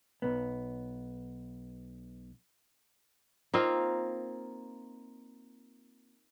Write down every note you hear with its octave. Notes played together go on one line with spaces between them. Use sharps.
B1 B3
A#3 C4 D#4 F4